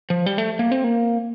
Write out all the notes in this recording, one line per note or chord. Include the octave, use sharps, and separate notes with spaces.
F3
G3
A3
A#3
C4
A#3